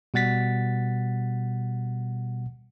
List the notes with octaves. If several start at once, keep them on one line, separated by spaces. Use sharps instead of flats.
B2 G3 F#5 A6 B6